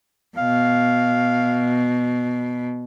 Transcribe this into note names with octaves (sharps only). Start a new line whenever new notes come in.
B2 F5